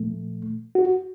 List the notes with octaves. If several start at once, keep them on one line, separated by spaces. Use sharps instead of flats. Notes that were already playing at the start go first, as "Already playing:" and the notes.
Already playing: A#2 F3 A3
F#4